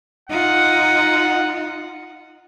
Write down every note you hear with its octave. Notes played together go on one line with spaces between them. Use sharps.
D#4 F4 F#5